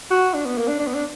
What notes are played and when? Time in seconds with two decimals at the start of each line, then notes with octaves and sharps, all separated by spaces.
0.11 F#4
0.34 D4
0.45 B3
0.57 A#3
0.68 D4
0.79 D4
0.87 B3
0.94 D4